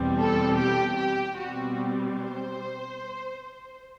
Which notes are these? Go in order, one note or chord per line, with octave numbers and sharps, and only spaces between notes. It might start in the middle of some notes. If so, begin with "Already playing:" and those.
Already playing: E2 B2 G3 C4
A4
G4
G4
B2 G3 C4 F#4
C5